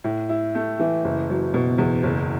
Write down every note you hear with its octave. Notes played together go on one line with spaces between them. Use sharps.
A2
E4
A3
E3
F#1
F#3
B2
E2
F#1